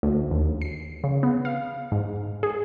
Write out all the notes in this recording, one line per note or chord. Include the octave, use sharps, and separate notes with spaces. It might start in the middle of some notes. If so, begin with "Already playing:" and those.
D2
D#2
C7
C#3
B3
F5
G#2
G#4